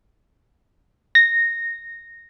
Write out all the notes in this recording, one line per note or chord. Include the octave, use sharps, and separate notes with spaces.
A#6